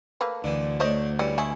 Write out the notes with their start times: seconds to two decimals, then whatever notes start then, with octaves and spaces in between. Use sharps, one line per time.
0.21 A3 A#3 B4
0.44 D2 D3 E3
0.80 A3 D4 C5 C#5 D#5
1.19 E3 G3 C#4
1.38 G#3 A3 E4 G#4